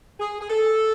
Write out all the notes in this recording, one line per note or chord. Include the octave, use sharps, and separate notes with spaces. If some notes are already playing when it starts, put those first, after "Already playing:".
G#4
G#4
A4